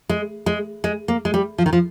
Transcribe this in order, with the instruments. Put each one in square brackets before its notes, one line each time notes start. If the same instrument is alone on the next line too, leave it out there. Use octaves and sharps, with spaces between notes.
[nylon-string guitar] G#3
G#3
G#3
A#3
G#3
G3
F3
D#3
F3